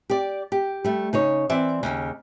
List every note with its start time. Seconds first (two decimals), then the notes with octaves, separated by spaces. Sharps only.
0.10 G4 D5
0.52 G4
0.84 G3 A3
1.13 C#3 D#4 C#5
1.49 E3 C4 D5 E5
1.83 D#2 C#3